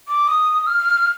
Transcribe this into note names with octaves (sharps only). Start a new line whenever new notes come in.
D6
D#6
F6